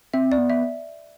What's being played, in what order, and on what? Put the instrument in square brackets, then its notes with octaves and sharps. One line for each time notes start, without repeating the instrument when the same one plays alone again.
[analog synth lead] C4 [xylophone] E5
[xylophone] D5
[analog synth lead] B3
[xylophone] E5